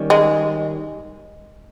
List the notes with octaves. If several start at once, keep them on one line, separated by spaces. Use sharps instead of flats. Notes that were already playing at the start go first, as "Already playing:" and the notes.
Already playing: D#3 G3 C#4
G#3